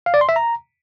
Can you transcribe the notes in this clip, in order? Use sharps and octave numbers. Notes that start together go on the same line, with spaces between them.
F5
D5
C6
E5
A#5